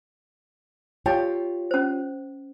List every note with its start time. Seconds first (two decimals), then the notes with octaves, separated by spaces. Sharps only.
1.06 F4 G4 C#5 G5 A5
1.71 C#4 C5